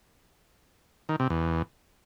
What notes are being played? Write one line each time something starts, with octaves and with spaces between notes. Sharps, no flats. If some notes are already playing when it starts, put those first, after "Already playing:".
D#3
C3
E2